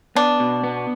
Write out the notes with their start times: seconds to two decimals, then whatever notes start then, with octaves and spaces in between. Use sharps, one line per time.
0.16 B3 D4
0.40 B2
0.63 B3